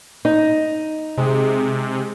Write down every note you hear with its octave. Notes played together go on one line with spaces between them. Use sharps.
D#4
C3 G#3